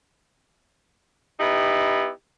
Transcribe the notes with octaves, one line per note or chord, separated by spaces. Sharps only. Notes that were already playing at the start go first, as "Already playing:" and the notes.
B3 D#4 E4 G4